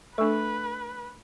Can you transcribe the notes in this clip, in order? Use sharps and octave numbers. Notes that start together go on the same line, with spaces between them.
A3 D4 A4 B4 C#6 E6